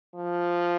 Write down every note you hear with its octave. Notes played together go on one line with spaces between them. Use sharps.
F3